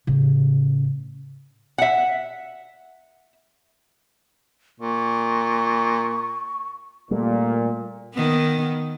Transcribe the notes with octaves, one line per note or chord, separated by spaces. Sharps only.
A2 C#3
E5 F#5
A#2 C#6
A#2 G3 A3
D#3 B3